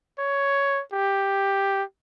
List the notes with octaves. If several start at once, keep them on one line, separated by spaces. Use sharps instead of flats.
C#5
G4